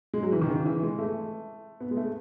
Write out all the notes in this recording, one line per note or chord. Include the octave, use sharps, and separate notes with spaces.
G#3
F#3
E3
D#3
C#3
E3
G#3
A3
B3
G#3
A3